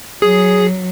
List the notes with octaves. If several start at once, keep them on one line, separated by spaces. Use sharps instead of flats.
F#3 G#4